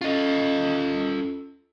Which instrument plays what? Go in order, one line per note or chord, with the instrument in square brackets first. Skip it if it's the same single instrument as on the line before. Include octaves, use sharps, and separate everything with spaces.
[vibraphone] C#4 A4 [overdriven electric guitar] F4 D#5